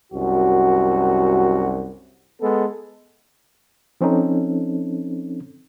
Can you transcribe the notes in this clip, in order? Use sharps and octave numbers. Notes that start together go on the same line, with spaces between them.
C2 F#2 F#4
G#3 B3 A4
F3 C4 C#4 D#4 A4